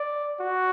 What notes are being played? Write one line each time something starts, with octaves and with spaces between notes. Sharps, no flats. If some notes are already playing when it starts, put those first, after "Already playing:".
Already playing: D5
F#4